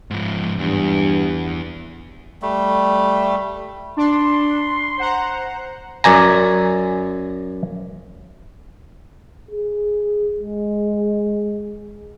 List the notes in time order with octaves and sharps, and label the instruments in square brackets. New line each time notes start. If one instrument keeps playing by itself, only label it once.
[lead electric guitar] G#2 F3
[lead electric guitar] E2 [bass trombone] G2
[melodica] G3 A3
[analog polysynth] D4 [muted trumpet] C6
[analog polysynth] C5 F#5 A#5
[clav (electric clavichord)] F#2 D5 G#5 A#5
[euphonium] G#4
G#3